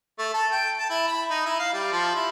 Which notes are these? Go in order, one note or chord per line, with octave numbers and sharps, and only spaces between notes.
A3
A4
G5
A5
E4
B5
D#4
E4
F5
G3
F3
E4